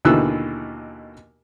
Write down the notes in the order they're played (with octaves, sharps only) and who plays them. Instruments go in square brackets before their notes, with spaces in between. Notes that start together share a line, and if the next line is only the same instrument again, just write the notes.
[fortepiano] D#2 B2 D3 E3 E6 F#6